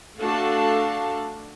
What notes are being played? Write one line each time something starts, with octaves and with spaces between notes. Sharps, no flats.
A3 D4 F#4 A4 F5 A5